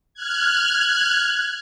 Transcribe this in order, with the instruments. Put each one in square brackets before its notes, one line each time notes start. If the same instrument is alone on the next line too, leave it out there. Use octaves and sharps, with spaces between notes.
[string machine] F6 F#6 G#6